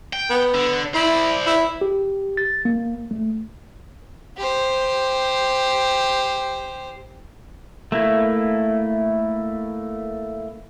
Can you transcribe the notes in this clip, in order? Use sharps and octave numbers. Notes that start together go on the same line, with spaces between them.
G5
B3
D3
E4 C5 D5
E4
G4
A6
A#3
A3
G4 C5
A3 A#3 E4